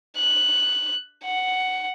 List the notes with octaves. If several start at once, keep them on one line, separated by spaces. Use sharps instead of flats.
F#6
F#5